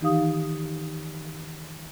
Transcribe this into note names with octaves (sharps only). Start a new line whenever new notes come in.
D#3 E3 D#4 G4 F5 D#6